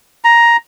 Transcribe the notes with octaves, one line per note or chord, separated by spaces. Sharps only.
A#5